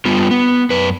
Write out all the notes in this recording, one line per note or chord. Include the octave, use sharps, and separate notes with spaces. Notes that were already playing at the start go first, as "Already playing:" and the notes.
G3 B3 F4
B3
F#2 B4